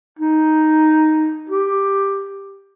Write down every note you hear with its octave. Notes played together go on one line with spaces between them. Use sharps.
D#4
G4